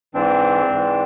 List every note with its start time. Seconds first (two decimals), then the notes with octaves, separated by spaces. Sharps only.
0.14 G#2 E3 C4 D4
0.72 G#2 E3